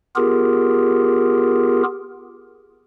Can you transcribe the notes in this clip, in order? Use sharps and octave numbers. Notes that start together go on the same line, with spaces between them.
B3 F4 G4 G#4 A#4